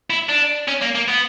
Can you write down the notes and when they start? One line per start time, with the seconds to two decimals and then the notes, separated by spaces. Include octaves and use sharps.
0.10 E4
0.29 D4
0.68 C#4
0.82 A#3
0.95 A#3
1.08 B3